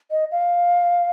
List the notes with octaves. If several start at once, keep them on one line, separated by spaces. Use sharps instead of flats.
D#5
F5